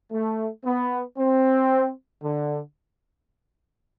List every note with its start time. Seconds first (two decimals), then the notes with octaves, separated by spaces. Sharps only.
0.12 A3
0.64 B3
1.17 C4
2.22 D3